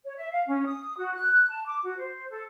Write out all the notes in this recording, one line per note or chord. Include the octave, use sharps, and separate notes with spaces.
C#5
E5
F5
C#4
D#6
F#4
F#6
A5
D6
F#4
C5
A4